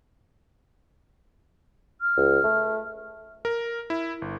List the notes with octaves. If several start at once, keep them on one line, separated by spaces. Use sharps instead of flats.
F6
C#2
A3
A#4
E4
G1